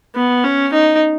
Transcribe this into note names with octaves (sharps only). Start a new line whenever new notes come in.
B3
C#4
D#4